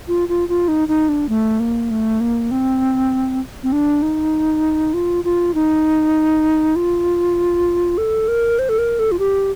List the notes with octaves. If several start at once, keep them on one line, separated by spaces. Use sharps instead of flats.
F4
F4
F4
D#4
D#4
D4
A3
A#3
A3
A#3
C4
C4
D4
D#4
F4
F4
D#4
F4
A4
A#4
C5
A4
A#4
A4
F4
G4